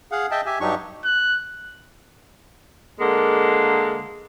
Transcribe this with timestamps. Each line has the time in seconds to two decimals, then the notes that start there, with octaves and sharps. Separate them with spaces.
0.11 G#4 F5 F#5
0.31 D#5 E5 G5 A5
0.46 G4 E5 G#5
0.61 G2 F#3 D4 D#4 G4 C#6
1.05 F#6
3.00 D3 G#3 A#3